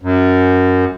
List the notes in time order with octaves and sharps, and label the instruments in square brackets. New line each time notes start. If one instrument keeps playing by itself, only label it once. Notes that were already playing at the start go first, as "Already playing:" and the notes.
[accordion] F#2